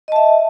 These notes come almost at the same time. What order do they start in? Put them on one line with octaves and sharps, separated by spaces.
D#5 A5 E5